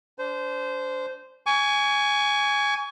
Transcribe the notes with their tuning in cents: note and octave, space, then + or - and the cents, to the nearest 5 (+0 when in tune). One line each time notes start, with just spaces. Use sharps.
D4 -35 C5 -20
G#5 +0 C#6 +35